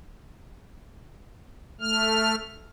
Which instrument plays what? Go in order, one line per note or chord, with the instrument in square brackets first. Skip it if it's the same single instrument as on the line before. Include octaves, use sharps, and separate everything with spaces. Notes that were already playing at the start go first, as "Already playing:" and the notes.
[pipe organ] A3 F6